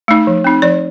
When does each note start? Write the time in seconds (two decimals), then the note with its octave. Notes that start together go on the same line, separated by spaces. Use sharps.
0.08 A3 D#4
0.27 F3
0.44 C4 D#4
0.62 F3 D5